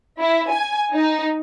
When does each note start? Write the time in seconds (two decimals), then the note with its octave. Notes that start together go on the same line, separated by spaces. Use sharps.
0.21 E4
0.52 G#5
0.95 D#4